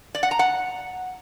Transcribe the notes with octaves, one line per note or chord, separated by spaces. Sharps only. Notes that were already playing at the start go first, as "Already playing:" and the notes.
D5
F#5
A#5
F#5